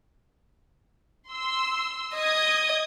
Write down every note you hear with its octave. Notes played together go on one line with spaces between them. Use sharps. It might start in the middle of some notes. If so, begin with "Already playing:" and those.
C6 E6
D#5 D#6 G#6